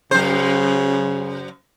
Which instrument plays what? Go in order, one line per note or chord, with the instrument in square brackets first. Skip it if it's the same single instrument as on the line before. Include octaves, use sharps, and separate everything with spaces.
[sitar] F#2 C5 [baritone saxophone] C#3